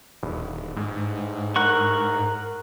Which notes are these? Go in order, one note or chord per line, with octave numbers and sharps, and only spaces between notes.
D#1
G#2
A#4 F#5 C#6